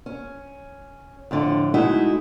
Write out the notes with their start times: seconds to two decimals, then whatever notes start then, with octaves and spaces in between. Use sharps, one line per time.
0.06 C#4
1.31 F2 A2 D3
1.74 G#3 A3 D#4 E4 F#4